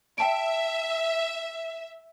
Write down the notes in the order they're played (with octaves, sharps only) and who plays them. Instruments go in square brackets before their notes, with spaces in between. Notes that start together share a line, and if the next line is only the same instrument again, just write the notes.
[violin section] E5 [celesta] G5 A5 D7